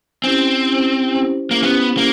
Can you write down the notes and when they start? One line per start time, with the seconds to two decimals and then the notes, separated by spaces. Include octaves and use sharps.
0.24 C4 C#4 E4 G4 C5
0.93 C#4 E4 G4 C5
1.51 A#3
1.63 B3 C#4 E4 G4 C5
1.97 A#3